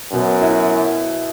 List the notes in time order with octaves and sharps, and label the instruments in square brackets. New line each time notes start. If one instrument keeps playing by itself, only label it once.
[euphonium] F#2 [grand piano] B2
[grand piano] E4